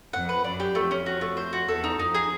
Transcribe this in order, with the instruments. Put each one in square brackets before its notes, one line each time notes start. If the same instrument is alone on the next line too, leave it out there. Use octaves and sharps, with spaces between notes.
[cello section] F2 [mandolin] F#5
[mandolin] B4
[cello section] F#2 [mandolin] D5
[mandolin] G4
[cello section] F2 [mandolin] A3
[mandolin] C#4
F#4
A3
C5
F#4
[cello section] E2 [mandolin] A4
[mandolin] D#4
[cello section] F2 [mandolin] D#4
[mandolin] G#4